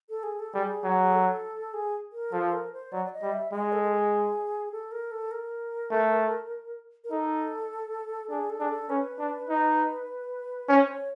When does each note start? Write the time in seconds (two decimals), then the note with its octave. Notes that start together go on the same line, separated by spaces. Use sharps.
0.09 A4
0.23 G#4
0.39 A4
0.53 G3 G#4
0.84 F#3
1.02 G#4
1.13 A4
1.73 G#4
2.12 A#4
2.32 F3 A4
2.52 A#4
2.73 C5
2.92 F#3 D5
3.05 D5
3.13 D#5
3.22 G3
3.32 E5
3.51 G#3 D#5
3.73 A4
3.83 A4
3.92 G#4
4.72 A4
4.92 A#4
5.11 A4
5.31 A#4
5.91 A3
7.04 A#4
7.11 D#4 A4
8.29 D4 G#4
8.50 A4
8.60 D4 G#4
8.69 A4
8.89 C#4 B4
9.19 D4
9.49 D#4
10.68 C#4 C5
10.88 C#5